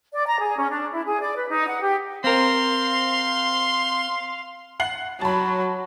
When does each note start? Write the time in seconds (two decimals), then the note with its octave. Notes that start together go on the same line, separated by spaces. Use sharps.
0.13 D5
0.27 A#5
0.41 G#4
0.58 C#4
0.70 D4
0.93 E4
1.05 G#4
1.20 D5
1.36 B4
1.50 D#4
1.67 F#5
1.82 G4
2.24 C4 A#4 F5 C6
4.80 F#5 C7 F#7
5.21 F#3 A5 B5